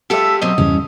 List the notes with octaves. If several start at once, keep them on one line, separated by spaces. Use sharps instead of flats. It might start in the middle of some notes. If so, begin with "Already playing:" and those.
G#3 F4 G4 A4 E5
B2 F#3 C4 D#5
E2 G2 C#3 C#4